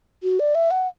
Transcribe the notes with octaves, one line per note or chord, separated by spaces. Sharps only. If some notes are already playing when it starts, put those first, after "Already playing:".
F#4
D5
E5
F#5